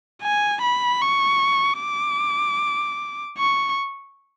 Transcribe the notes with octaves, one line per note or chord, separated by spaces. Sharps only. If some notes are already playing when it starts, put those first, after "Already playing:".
G#5
B5
C#6
D6
C#6